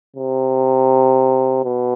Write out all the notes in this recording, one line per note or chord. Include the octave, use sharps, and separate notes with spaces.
C3
B2